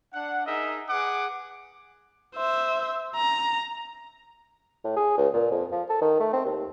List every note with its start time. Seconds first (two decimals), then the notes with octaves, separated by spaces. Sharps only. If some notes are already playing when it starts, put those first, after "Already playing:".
0.14 D4 F#5
0.46 D#4 G#4 A#4 D#5 E5
0.89 G#4 B4 F#5 D6
2.36 C5 E5
3.16 A#5
4.85 A2
4.97 G#4
5.18 C#2
5.34 A#2
5.51 F2
5.72 F3
5.89 A4
6.02 D#3
6.20 A3
6.33 C4
6.45 D#2